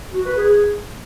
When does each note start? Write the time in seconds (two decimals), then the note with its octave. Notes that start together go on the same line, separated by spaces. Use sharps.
0.13 F#4
0.25 B4
0.37 G#4